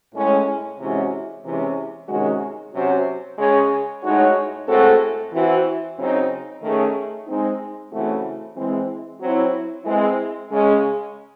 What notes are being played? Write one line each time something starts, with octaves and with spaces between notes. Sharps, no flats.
A2 G#3 C#4
C3 E3 G#3 C#4 F#4
C3 E3 G#3 C#4
C3 D#3 G#3 C#4 F#4
C3 F#3 C#4 F#4 C5
C#3 G#3 C#4 G#4 C#5
A2 G#3 D#4 F#4 C#5
A2 G#3 C4 F#4 A4
E3 C4 F#4
C#3 F#3 C4 D#4
D#3 A3 C#4 G#4
G#3 C4 D#4
C#3 E3 A3 C4 F#4
E3 G#3 C4
F#3 C4 E4
E3 G#3 C4
C#3 G#3 C#4